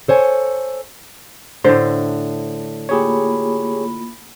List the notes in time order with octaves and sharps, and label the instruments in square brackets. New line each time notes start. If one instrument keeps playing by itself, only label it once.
[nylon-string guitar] A4 C5 C#5 G#5
[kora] A2 D3 [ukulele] C5
[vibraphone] A#3 F4 B5 [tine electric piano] G4 G#4 C#5